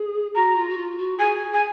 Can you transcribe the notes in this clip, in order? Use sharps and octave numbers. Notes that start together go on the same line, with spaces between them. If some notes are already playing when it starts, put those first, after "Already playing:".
Already playing: G#4
F#4 A#5
F4
F#4
F4
F#4
G#4 G#5
G#5